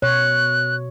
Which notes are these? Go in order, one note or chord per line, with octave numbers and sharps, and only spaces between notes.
B2 C#5 F#6